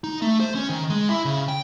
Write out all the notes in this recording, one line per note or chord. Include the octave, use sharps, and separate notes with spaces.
D#4
A3
C5
C#4
D#3
G#3
E4
C#3
G5